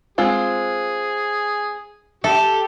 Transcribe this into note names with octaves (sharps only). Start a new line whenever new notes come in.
G#3 C4 F4 G#4
G4 A4 E5